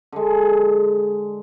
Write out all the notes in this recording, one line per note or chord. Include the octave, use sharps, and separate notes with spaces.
D3 G#3